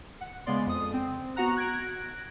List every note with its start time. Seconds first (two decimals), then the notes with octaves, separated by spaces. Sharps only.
0.21 F#5
0.46 C#3 G#3 B3 D5 C6
0.67 F2 D#6
0.93 C4
1.36 B3 F#4 F#5 A#5 F#6
1.56 F#6 G#6 A#6 D7